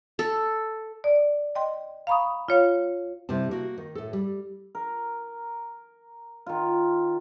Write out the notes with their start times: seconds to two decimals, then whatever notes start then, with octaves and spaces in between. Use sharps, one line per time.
0.19 A4
1.04 D5
1.55 D#5 G5 C6
2.07 F5 A#5 B5 C#6 D#6
2.49 F4 C#5 F5
3.29 C3 G3 E4 A5
3.51 A#3 F#4
3.78 D#3
3.95 A2 A4
4.13 G3
4.75 A#4
6.46 D#3 F4